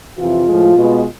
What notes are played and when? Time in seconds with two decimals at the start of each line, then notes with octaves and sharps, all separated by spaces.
0.18 F2 C3 E3 F4
0.47 A2 F3 G#3
0.75 B2 G#3 B3